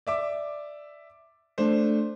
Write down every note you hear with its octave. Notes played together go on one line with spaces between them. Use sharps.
D5 E5 D6
A3 D4 C5